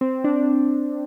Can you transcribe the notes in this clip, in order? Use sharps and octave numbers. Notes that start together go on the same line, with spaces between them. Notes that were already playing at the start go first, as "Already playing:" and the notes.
C4
D4